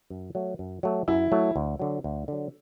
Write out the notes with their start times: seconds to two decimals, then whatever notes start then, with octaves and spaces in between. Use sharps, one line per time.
0.10 F#2
0.35 F#3 A3
0.59 F#2
0.83 F#3 A3
1.08 F#2 E4
1.32 F#3 A3
1.56 D2
1.79 D3 F#3
2.04 D2
2.28 D3 F#3